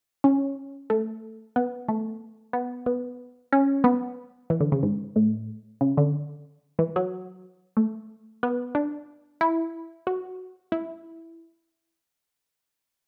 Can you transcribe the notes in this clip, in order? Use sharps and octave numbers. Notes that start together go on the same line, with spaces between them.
C#4
A3
B3
A3
B3
B3
C#4
B3
E3
D3
C#3
G#2
A2
C#3
D3
E3
F#3
A3
B3
D4
E4
F#4
E4